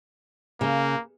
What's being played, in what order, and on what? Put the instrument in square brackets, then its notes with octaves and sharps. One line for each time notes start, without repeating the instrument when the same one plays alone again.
[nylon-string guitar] C#3 [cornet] A#3